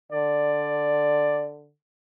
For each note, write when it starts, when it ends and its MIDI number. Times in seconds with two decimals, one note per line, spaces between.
0.12 1.72 50
0.12 1.51 74